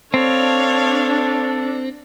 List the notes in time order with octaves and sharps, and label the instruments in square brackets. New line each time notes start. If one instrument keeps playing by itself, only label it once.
[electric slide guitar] C4 [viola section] D4 [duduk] A4 [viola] C#5 F5